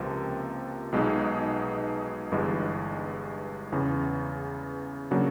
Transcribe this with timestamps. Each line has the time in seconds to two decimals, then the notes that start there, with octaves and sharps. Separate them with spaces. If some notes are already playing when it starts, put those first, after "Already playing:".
Already playing: C#2 C3 F3 A#3
0.92 B1 B2 G#3 B3 D#4
2.32 G1 G2 E3 G#3
3.72 E2 C#3 E3
5.11 C#3 F#3 A#3 D4 F#4